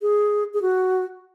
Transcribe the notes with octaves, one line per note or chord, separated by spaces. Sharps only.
G#4
G#4
F#4